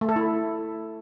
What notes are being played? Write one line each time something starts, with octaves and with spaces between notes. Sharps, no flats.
A3
A4
E4